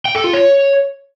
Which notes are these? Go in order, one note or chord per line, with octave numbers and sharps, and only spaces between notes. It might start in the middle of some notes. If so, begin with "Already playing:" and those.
G5
A4
F4
C#5